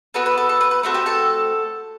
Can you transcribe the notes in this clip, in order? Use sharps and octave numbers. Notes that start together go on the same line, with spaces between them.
B3 F#4 A4 B4
B4
A4
A4
B4
B4
A3 C4 F#4 A4
G4 G5
A4 A5